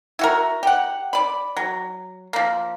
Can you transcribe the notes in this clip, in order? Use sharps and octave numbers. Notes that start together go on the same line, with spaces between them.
E4 F#4 A#4
G4 F#5
D5 B5
F#3
F3 A#3